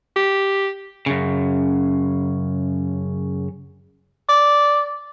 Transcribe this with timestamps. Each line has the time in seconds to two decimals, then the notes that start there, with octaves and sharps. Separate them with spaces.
0.16 G4
1.06 F#2 C#3
4.29 D5